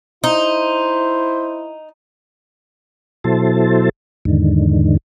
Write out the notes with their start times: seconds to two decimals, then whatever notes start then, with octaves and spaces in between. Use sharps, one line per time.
0.24 D#4 E4 C5
3.24 B2 F#3 E4 A4 C5 A5
4.25 E2 G#2 D3 D#3